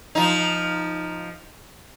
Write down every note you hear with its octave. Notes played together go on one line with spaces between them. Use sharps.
F3 D#4